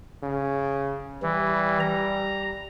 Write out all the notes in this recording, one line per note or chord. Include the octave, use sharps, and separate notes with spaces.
C#3
E3 G3
A#5